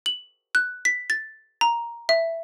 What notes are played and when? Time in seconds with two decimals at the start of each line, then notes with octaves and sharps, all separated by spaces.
0.06 F#7
0.55 F#6
0.85 B6
1.10 A6
1.61 A#5
2.09 E5